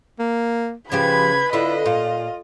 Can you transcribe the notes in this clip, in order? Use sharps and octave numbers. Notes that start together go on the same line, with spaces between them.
A#3
C#3 F3 F4 G4 B4 B5 G#6
D3 E4 F4 D#5
A#2 F4 F5